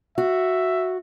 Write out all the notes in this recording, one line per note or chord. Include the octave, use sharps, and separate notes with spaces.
F#4 E5